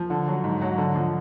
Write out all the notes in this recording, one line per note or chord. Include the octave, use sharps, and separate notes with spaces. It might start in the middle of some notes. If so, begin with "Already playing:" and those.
Already playing: F3
D3
F#3
G#2
F#3
D3
F3